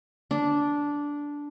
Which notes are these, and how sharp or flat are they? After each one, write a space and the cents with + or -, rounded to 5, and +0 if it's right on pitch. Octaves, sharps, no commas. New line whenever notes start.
D4 -10